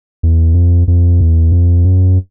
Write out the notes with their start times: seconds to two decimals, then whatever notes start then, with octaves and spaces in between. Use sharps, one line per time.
0.23 E2
0.55 F2
0.88 F2
1.21 E2
1.52 F2
1.84 F#2